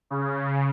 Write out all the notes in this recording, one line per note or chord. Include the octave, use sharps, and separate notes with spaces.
C#3